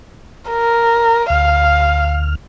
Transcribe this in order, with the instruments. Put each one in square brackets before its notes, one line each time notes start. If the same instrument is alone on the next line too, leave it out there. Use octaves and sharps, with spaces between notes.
[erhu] A#4
[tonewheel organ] D2 F6 [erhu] F5